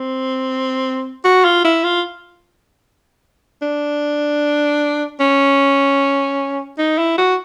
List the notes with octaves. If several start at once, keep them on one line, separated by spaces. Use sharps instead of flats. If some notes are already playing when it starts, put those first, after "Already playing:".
Already playing: C4
F#4
F4
E4
F4
D4
C#4
D#4
E4
F#4